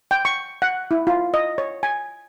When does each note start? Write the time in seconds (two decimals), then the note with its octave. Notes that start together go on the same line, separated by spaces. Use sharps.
0.11 G5
0.25 C#6
0.62 F#5
0.91 E4
1.07 F4
1.34 D#5
1.58 C#5
1.83 G#5